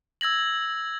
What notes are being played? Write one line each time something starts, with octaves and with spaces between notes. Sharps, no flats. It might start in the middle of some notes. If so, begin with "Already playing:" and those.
E6 G#6 A#6 F#7